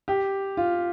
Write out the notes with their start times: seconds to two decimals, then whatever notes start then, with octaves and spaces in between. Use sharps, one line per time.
0.08 G4
0.57 F4